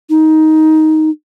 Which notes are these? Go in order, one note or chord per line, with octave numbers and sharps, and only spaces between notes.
D#4